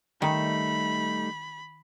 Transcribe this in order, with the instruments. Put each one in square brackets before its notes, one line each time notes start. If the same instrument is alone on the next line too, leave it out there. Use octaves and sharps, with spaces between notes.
[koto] D#3 [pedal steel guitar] G3 A3 D#4 [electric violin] B5